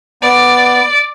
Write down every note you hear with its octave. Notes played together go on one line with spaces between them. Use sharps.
B3 D5